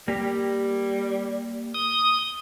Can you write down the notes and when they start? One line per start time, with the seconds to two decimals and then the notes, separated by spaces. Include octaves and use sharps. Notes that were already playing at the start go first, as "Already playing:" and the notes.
0.08 G3 A#3 G4
1.74 D#6